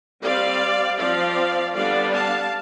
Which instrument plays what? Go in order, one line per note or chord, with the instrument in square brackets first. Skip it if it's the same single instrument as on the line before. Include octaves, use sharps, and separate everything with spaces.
[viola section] G3 C4 D5 F5
F3 C4 D5 F5
D3 G3 B3 D4 D5 F5
F5 A5